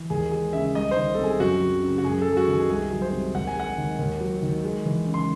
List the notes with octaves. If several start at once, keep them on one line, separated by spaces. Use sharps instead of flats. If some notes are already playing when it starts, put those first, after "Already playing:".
Already playing: E3
D#2 G#4
G#3 G#4
C#3 E5
C2 D#5
D#3 C5
A4
C3 G#4
F#2 F#4
F#3
C#3
F#4
F#2 G#4
F#3 A4
G#4
F#4
D#3
G#4
C2 G#4
F#3
C5
C3
D#2 F#5
G#5
G#3 F#5
D#3
D#2
F#3
D#3
G#3
E3
C#3
C6